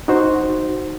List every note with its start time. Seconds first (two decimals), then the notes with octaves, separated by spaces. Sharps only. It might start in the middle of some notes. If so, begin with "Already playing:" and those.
0.08 D#4 F#4 C5